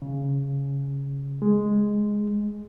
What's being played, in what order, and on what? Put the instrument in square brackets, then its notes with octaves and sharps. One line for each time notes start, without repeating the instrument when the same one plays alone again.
[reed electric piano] C#3
G#3